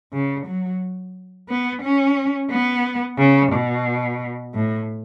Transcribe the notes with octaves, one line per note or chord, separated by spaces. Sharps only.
C#3
F#3
B3
C#4
B3
C#3
B2
A2